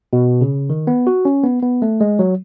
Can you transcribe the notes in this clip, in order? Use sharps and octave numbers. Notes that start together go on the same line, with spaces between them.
B2
C#3
D#3
B3
F#4
C#4
B3
B3
A3
G#3
F#3